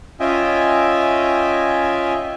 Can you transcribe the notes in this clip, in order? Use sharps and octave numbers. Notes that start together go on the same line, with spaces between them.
C#4 F4 D#5 E5 G5 G#5